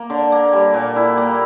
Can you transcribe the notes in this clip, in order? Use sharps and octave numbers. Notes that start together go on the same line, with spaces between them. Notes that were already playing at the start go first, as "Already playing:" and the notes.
Already playing: A#3
D3
A#3
G3
A#2
E4
A#3